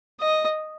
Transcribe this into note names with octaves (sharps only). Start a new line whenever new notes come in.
D#5